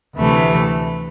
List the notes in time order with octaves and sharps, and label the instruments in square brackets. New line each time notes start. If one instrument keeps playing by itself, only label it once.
[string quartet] D2 C3 E3 A3